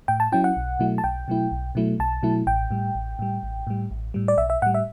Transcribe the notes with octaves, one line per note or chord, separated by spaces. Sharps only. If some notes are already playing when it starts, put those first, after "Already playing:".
A2 G5
A5
F#3 C#4 E4 G5
F#5
B1
B2 F#3 A3 E4
A5
B1 G5
B2 F#3 A3 E4
B1
B2 F#3 A3 E4
B1 A5
B2 F#3 A3 E4
A1 G5
A2 G3
A1
A2 G3
A1
A2 G3
A1
A2 G3
D5
B1 E5
E5
A2 G3 F#5
E5